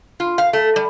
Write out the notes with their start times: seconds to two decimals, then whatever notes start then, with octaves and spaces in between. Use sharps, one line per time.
0.20 F4
0.38 F5
0.53 A3
0.76 G3